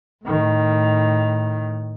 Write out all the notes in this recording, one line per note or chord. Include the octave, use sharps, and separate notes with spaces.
A2 D#3